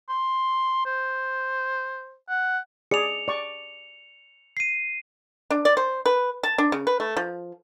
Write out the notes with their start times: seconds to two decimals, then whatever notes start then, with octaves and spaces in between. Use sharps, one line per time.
0.09 C6
0.86 C5
2.29 F#5
2.91 G#4 D5 C#7 F7
3.28 D5 C#6
4.57 C7 D#7
5.50 D4
5.65 D5
5.77 C5
6.06 B4
6.43 A5
6.58 D4
6.72 C#3
6.87 B4
7.00 A3
7.17 F3